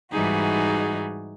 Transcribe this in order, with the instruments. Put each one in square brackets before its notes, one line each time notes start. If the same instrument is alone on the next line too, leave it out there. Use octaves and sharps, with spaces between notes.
[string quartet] G#2 E3 G3 D#4 F#4 G#4